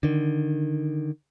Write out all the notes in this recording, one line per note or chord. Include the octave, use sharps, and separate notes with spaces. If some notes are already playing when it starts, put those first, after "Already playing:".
D3 D#3